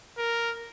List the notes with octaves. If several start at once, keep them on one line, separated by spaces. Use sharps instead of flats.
A#4